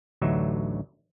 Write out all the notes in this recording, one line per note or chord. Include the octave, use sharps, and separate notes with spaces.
A1 D2 D3 F#3 D#4 E5